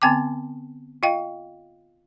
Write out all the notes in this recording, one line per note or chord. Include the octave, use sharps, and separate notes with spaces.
D3 B3 C4 G5 A5 D6
F4 D#5 F5 G5